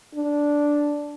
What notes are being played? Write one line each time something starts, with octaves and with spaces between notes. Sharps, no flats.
D4